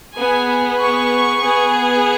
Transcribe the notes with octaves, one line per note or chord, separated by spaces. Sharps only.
B3 G#4 G#5
C#6
B3 G#4